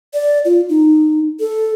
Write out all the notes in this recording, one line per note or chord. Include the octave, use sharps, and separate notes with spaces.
D5
F4
D#4
A4